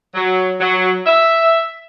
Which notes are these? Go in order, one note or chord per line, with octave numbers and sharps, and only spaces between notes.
F#3
F#3
E5